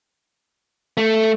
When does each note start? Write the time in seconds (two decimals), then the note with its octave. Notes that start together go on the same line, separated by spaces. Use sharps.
0.97 A3